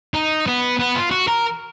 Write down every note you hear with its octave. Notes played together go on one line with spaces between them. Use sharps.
D#4
B3
B3
F4
F#4
A#4